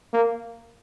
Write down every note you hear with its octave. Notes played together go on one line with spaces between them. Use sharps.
A#3